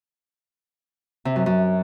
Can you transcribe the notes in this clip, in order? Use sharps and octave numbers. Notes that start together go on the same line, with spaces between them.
C3
F#2
F#2